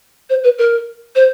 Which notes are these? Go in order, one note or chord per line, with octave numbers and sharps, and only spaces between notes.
C5
B4
A#4
C5